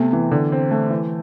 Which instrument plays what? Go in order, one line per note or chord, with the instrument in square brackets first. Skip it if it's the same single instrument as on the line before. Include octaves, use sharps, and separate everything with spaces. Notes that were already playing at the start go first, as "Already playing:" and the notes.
Already playing: [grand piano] C3 A3 [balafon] B3
[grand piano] E3
D3
C4
A3
E3